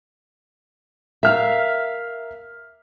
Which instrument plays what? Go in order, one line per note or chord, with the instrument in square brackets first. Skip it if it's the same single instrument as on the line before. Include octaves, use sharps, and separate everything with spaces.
[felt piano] A#4 F6 [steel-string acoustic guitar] E5 F5